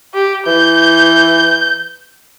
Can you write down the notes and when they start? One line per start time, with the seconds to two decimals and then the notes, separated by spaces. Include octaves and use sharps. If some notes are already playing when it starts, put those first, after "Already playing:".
0.14 G4
0.46 E3 G6